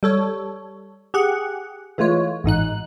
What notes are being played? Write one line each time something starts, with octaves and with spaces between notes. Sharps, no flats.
G3 A4 C#5
G4 G#4 F#5
E3 G#3 A3 F4 C#5
A1 G#2 D#4 F#6